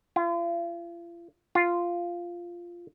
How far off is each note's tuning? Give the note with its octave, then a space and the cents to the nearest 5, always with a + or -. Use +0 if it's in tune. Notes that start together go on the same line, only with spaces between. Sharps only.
F4 -40
F4 -5